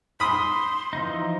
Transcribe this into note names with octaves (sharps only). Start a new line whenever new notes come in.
B5 C6 D#6
E3 F3 D#4